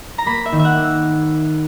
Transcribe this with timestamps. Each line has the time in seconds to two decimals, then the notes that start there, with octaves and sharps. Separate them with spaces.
0.18 A#5
0.26 A#3 B5
0.46 E5
0.52 D#3
0.59 E5
0.65 F#5
0.77 A#3
0.84 E6